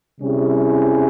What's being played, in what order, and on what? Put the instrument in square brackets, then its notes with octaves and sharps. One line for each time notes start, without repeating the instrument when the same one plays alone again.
[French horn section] C3 G3 C#4 E4 G#4